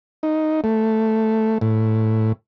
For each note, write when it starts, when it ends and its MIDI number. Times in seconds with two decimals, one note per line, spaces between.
0.23 0.61 63
0.64 1.58 57
1.61 2.32 45